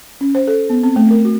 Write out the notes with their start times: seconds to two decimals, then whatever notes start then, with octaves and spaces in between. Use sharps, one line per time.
0.21 C#4
0.35 C5
0.47 A4
0.70 B3
0.83 C4
0.96 A3
1.11 A#4
1.25 F#4